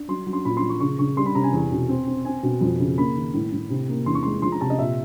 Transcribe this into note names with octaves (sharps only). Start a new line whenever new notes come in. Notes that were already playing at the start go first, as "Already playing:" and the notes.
Already playing: D4
F#3 C6
F#3
C6
A#2 B5
C6
F3
C#6
C#3 C#6
C#3 C#6
G3 C6
B5
C3 A#5
G#5
E2
B2
C4
C4
C4 G#5
B2
F2
C#3
A#3 B5
D#3
A2
A2
C3
A#3
E2 C6
C#6
G#3 C6
F3 C6
A#5
C3 A5
D#5
A#2 E5